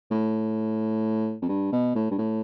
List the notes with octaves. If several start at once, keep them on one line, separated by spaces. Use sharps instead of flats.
A2
F2
G2
B2
A2
G2
A2